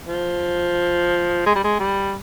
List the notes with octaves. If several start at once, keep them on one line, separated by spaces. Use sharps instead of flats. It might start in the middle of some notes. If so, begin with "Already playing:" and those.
F3
G#3
G3
G#3
G3